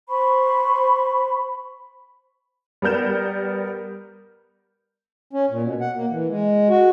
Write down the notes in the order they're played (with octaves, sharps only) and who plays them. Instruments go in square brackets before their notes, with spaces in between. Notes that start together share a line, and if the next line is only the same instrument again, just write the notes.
[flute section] C5 B5 C#6
[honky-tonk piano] G3 B3 A#4 G6 E7
[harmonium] C#4
A#2
B2
F#5
A#3
E3
G#3
F#4